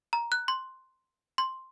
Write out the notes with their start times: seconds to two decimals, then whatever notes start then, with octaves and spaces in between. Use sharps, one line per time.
0.13 A#5
0.32 F#6
0.48 C6
1.38 C6